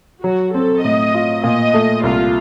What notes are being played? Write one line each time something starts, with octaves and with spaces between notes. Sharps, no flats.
F#3 F#4
C4 A4
A2 D#5
F4
A#2 D#5
A3
C2 F4